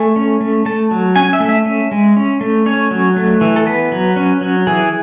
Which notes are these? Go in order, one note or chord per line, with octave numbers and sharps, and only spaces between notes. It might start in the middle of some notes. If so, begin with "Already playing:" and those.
Already playing: A3 G#5
C#4
A3
A3 A5
F#3
C#4 G#5
E5
A3
E5
C#4
G#3
C#4
A3
C#4 C#5
F#3
A3
E3
A4
B3 B4
F#3
C#4
F#3
E3 G#4